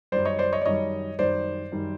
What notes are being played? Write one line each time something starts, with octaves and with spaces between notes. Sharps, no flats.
F#2 D#3 G3 C5 D5
C#5 D#5
C5 D5
C#5 D#5
D5
F#2 D#3 G3 C#5 D#5
F#2 D#3 G3 C5 D5
F#2 D#3 G3